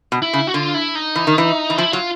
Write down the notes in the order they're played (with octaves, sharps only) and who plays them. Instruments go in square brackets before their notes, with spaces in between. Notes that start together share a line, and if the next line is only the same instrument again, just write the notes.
[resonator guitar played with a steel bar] B2
[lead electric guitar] E4
[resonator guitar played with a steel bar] C#3
[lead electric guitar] F#4
[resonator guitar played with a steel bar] D3 [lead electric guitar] F4
[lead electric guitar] E4
D#4
[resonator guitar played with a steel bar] E3
D#3
E3
E3
[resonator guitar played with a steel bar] F3 [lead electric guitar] E4
[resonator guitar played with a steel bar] F#3 [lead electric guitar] F4